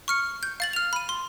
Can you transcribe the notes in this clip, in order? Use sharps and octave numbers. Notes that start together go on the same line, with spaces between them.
C#6 F6 C#7
G6
F5 A6 F#7
F6 F7
B5 D#7
C6